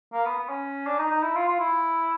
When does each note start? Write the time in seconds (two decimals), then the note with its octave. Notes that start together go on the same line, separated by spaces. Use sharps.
0.13 A#3
0.25 B3
0.38 B3
0.49 C#4
0.86 D4
0.98 D#4
1.11 D#4
1.23 E4
1.36 F4
1.47 F4
1.59 E4